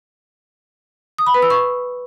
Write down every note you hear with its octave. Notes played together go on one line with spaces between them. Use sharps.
D#6
B5
B4
E6
C#6